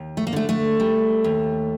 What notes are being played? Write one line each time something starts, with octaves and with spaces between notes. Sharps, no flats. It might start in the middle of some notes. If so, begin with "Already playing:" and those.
Already playing: D#2
A3
A#3
D3 A3
A3
G3
D#2